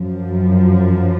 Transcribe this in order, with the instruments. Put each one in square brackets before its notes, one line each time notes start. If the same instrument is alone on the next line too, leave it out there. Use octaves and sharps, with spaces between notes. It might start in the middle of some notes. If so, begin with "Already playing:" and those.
Already playing: [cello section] F#2 F3